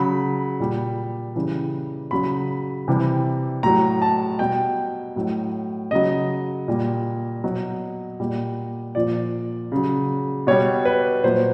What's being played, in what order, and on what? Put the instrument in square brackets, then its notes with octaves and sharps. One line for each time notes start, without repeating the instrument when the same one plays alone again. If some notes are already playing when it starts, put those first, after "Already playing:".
Already playing: [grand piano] C#3 F#3 B5
A#2 G3
C#3 E3 G3
C#3 F#3 B5
C3 E3 G3
A2 F#3 A#5
A5
B2 G3 G5
A2 F#3
C#3 F#3 D#5
A#2 G3
B2 F#3
A#2 G3
A#2 F3 D5
C#3 F#3
B2 G3 C#5
B4
A#2 F#3 C5